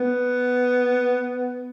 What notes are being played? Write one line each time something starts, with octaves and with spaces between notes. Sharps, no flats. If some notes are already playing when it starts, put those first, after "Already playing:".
Already playing: B3